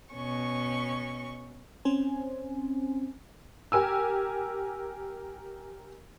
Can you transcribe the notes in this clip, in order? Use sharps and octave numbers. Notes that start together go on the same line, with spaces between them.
B2 C#4 C#6
C4 C#4 C5 G#5
G4 A#4 G#5 E6